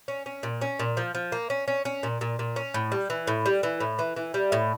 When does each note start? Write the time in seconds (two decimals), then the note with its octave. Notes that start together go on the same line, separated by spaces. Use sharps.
0.08 C#4
0.26 C#4
0.43 A#2
0.61 C#4
0.80 A#2
0.97 F3
1.15 F3
1.32 A#3
1.50 C#4
1.68 C#4
1.85 C#4
2.03 A#2
2.21 A#2
2.39 A#2
2.56 C#4
2.74 A2
2.92 G3
3.10 E3
3.27 A2
3.46 G3
3.63 E3
3.80 A2
3.99 E3
4.17 E3
4.34 G3
4.52 A2